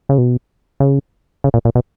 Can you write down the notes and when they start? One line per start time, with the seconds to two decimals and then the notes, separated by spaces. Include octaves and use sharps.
0.09 C#3
0.18 B2
0.80 C#3
1.44 C#3
1.54 A#2
1.65 A#2
1.75 B2